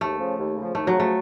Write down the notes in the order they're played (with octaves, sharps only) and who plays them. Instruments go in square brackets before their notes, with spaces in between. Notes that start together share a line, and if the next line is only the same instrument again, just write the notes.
[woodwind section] D#2 [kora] A3
[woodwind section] C#3 F3
D#2
C#3 F3
[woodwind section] D#2 [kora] A3
[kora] F#3
[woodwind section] C#3 F3
[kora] A3